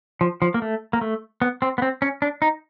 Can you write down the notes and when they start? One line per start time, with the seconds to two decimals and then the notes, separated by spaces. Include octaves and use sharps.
0.21 F3
0.42 F3
0.54 A#3
0.62 A3
0.93 A#3
1.01 A3
1.42 B3
1.62 C4
1.78 B3
1.82 C4
2.02 C#4
2.22 D4
2.42 D#4